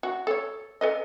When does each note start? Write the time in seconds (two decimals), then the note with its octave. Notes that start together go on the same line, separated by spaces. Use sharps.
0.03 F#4
0.27 A4 C#5
0.81 A4 B4 D#5